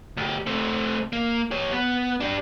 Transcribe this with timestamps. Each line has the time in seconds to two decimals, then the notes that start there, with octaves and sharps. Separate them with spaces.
0.17 D2 G4
0.47 A3 C4
1.13 A#3
1.51 G4 C#5
1.71 B3
2.20 D4 G4